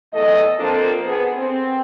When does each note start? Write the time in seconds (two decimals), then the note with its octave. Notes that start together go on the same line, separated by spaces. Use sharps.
0.13 E2 A3 A4 D#5
0.59 F3 A#3 C4 D4 A4
1.06 B3 G#4
1.37 C4